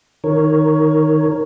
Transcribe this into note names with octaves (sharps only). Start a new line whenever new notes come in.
D#3 A#4 C#5